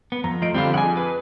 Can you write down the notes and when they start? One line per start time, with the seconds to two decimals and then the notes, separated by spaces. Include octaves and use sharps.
0.12 B3
0.24 F2 A#5
0.42 F3 A3 D#5 D7
0.54 F2 D3 G3 C4 F4
0.74 F2 G#4 F#5 G#5
0.97 B4